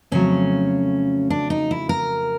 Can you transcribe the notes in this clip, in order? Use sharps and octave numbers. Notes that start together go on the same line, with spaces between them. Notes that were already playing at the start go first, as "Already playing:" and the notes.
F2 C#3 F#3 A3 C#4
D4
D#4
E4
A#4